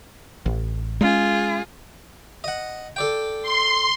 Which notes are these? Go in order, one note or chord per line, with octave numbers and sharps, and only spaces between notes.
A1
G#3 C#4 F4 G#4
D#5 F#5
A4 D5 G5
C6